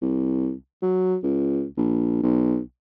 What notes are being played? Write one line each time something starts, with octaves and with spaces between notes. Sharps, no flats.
C2
F#3
C#2
A#1
B1